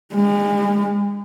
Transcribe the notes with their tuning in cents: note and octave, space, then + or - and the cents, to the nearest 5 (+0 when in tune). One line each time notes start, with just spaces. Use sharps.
G#3 -35